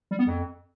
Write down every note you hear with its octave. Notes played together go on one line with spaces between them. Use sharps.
G3
B3
F2